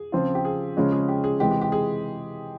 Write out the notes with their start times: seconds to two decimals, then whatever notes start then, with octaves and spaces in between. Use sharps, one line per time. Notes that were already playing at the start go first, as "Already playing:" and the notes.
Already playing: G#4
0.12 C#3 F3 C4 F4
0.35 G4
0.45 G#4
0.77 C#3 F3 G#3 C#4
0.92 G#4
1.08 G4
1.24 G#4
1.40 C3 E3 G#3 G4
1.51 G4
1.61 G4
1.72 G#4